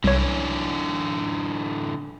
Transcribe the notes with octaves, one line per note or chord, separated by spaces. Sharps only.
C2 D3 E3 C#5